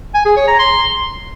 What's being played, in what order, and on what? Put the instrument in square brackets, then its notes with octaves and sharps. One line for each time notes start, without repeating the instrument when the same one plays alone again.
[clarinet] G#5
G#4
C#5
A#5
C6